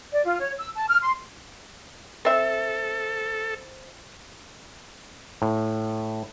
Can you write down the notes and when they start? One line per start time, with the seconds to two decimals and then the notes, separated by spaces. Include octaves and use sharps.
0.12 D5
0.25 F4
0.39 C#5
0.57 E6
0.74 A5
0.87 F6
1.01 C6
2.25 C4 A4 E5
5.42 A2